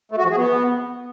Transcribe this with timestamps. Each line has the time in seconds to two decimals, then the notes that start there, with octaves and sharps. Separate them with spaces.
0.11 A3
0.18 F#4
0.24 F3
0.30 G#4
0.37 B3